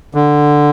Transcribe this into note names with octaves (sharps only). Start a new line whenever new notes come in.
D3